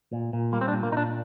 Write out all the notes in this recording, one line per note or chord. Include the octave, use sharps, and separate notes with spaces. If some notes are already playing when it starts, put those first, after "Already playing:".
A#2
A#2
G3 A#3
C4
D4
A#2
A#3
A#2 D4 D#4